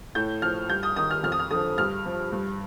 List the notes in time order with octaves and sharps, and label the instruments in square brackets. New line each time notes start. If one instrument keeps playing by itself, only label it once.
[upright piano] A2 G6
F3 F6
G2 G6
D#6
D#3 D#6
F6
F2 F6
D#6
F6
D3 F3 D#6
G2 F6
F3
G2